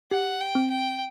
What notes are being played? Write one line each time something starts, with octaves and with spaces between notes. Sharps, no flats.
G4 F#5
G5
C4
G5